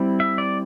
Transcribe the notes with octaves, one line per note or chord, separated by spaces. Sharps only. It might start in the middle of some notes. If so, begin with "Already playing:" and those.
Already playing: G3 C4 E4
E5
D5